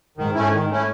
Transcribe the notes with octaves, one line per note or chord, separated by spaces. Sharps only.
G#2 D#3
A3 C#4 E4
D#3
A3 C#4 E4